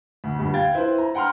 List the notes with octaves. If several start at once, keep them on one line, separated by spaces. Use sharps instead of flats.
D2
D2 G2 A#2
F5 G5 G#6 A6
E4 B4 C5
A#5
F#5 G5 A#5 C6 F6